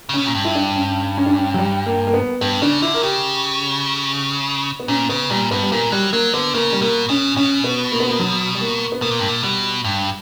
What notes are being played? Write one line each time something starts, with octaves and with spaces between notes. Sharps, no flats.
C#3
B2 C#4
A#2
G2
E4
D4
C#4
C#4
D4
C#4
F#3
G3
A#3
A#3
B3
G2 B3
C#3 D4
D3 E4
A#4
C#3 G4
B3
A#2 C#4
C#3 B3
A#2 G3
G2 B3
G3
A#2 A#3
F#3 G3
F#3 A#3
D3 B3
C#3 A#3
G3
B2 A#3
B2 C#4
B2 C#4
B3
A#3
B3
A#3
F#3
G3
A#3
B3
B2 A#3
A#2
G2
A#2
B2 G3
G2